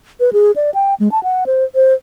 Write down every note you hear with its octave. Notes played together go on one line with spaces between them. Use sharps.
B4
G#4
D5
G5
G#3
A5
F#5
C5
C5